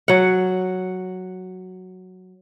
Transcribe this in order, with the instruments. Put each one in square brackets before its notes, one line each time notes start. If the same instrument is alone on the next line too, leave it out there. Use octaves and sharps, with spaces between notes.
[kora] F#3 F#5